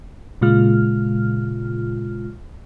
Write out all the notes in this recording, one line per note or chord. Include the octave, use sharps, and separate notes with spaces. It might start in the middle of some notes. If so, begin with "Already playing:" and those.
A#2 C#3 G#3 F4 F6